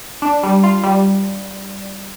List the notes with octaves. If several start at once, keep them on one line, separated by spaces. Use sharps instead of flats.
D4
G3
F4
G3